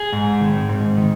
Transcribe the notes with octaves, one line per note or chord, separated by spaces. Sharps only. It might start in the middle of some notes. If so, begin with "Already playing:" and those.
Already playing: G#4
G#2
D#3
G#2
D#3